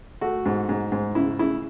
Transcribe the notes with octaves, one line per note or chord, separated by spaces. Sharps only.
A3 F#4
G#2
G#2
G#2
C#3 E4
C#3 E4